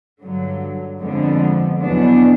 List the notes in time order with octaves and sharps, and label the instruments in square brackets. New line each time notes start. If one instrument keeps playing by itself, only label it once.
[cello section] G2 D3 F#3
F2 D3 F3 G#3 B3
E2 B2 F#3 B3 D4